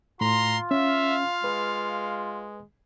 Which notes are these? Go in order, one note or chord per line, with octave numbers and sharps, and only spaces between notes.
A2 F4 A#5 C6
C#4 E5 F5
G#3 B4